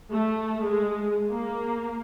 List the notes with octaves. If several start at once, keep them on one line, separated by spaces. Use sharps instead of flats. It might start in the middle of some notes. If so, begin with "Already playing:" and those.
A3
G#3
A#3